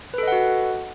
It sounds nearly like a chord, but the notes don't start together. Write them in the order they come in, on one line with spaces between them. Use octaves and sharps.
B4 A4 D#5 F#5 F#4